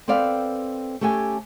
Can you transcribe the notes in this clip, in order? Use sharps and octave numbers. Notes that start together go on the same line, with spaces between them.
C4 A4 B4 D5 F5 G5
A3 C#4 G4 A4 G#5